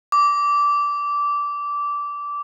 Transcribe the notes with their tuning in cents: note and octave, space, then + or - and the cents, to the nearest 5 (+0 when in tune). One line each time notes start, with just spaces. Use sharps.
D6 -15